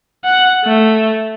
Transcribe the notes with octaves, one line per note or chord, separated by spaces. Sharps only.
F#5
A3